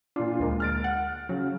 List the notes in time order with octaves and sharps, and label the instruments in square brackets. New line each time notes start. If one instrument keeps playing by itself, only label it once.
[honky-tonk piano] A#2 F4 [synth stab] D4
[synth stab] D2 G#3 A#3
[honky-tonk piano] F6 A6 D7
[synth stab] F#5
[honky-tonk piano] C#3 [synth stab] F#3